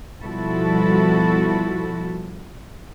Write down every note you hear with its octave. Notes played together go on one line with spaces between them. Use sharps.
B2 F3 G3 E4 F#4 A4